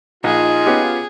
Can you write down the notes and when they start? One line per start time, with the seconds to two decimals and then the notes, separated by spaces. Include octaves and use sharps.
0.24 A#1 D#4 F4 G#4
0.66 B3 C#4 G4